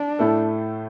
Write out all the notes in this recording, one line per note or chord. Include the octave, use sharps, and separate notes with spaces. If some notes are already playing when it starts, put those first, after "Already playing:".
Already playing: D4
A2 A3 E4 A4